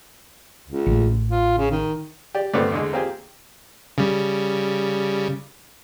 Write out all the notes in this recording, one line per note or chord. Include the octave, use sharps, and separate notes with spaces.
C#2
A1
F4
C#3
D#3
G4 D5
G2 D3 A3 B3 C4
E2 D3 G#3
A#3 C4 F4 G4 G#4
C#3 G3